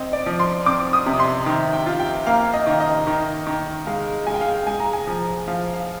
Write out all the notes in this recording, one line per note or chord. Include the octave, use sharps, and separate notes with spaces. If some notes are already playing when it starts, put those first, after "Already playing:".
Already playing: C4 D#5
D5
F3
C6
C4 D6
D#6
C3
C6
D#3
G5
F4
G5
A#3 F5
D#5
D#3
D#5
D#3
D#3
G#3 F5
G#3 G#5
G5
F5
G5
G#3 G#5
A#5
G#5
F3
F3 F5
F5